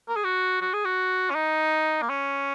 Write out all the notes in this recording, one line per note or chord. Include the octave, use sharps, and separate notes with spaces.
A#4
G#4
F#4
F#4
G#4
F#4
C#4
D#4
A#3
C#4